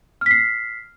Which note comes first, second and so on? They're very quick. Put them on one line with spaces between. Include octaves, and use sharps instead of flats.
F6 B6 C7